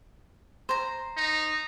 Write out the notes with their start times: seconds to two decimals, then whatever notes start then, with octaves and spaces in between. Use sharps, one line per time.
0.69 C5 A#5
1.17 D#4